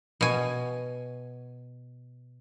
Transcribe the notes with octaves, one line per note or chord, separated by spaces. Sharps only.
B2 G#5